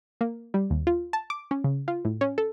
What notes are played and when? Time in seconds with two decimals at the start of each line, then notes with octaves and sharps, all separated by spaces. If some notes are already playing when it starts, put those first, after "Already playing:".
0.21 A#3
0.54 G3
0.70 D#2
0.87 F4
1.13 A5
1.30 D6
1.51 C#4
1.64 C#3
1.88 F4
2.05 A2
2.21 C#4
2.38 A4